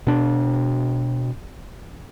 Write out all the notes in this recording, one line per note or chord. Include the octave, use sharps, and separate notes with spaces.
B2 D4